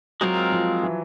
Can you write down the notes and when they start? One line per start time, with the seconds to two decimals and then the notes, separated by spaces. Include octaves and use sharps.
0.21 F#3 G#3 C4 F4 A#4
0.52 F3
0.83 E3